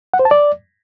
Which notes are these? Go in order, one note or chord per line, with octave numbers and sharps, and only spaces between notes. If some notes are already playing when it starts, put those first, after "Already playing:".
F#5
C5
A5
D5